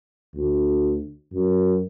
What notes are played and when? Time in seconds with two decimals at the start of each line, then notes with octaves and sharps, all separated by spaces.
0.35 D2
1.33 F#2